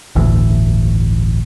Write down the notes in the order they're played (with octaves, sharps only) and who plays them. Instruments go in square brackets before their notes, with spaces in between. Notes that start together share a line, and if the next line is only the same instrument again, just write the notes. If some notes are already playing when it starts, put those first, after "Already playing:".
[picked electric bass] G1 D2 A2 E3